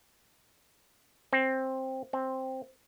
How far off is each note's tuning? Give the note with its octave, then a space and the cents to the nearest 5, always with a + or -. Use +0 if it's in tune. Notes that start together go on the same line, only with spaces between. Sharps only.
C4 +10
C4 +5